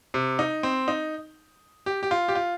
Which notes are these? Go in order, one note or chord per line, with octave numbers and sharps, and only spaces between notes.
C3
D#4
C4
D#4
G4
G4
F4
G4
F4